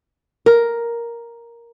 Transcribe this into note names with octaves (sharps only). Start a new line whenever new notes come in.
A#4